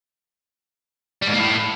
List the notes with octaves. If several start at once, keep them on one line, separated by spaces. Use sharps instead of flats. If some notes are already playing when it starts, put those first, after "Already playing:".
G3
G#2
A#3
A2